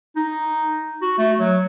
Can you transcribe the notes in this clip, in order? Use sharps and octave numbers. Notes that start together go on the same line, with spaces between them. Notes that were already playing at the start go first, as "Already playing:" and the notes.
D#4
F#4
A3
F#3